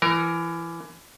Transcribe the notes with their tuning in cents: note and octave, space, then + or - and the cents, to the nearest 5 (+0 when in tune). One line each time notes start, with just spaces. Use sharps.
E3 +25 A#4 +5